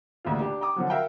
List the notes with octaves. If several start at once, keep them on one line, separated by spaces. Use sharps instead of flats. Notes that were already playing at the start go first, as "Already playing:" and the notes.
A1 D2 A#2 C#3 F4
D4 G4
G5 A#5 D6 D#6
D3 F3 F#3
F#4 A#4 E5 F5 G5